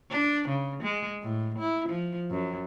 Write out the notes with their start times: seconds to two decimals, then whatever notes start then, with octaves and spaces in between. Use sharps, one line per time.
0.11 D4
0.48 C#3
0.83 G#3
1.22 A2
1.59 E4
1.89 F3
2.31 F#2